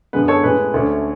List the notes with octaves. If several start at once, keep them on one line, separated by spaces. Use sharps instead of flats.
F#2 D3 G#3 B3 B4
A4 C#5
A2 G#3 C#4 B4
D2 D3 A3 C#4